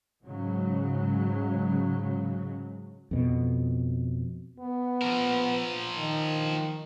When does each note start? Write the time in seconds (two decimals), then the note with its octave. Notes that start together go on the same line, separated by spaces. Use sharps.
0.23 G#2 C#3 F#3
3.11 F2 B2
4.60 B3
5.02 F3 A#4
5.97 D#3